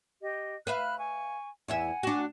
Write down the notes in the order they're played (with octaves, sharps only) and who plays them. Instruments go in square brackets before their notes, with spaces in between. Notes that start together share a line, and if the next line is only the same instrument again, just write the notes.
[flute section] G4 D#5
[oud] B4 E5 F5 [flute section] B5 F6 F#6
[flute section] G#5 C#6
[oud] E2 E4 E5 [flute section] F#5 G#5
[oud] D4 F#4